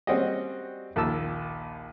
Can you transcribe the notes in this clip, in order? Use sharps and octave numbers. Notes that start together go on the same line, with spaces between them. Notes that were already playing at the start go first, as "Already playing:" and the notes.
G3 C4 C#4 F#4 G#4 D#5
A#1 D#2 A5 E6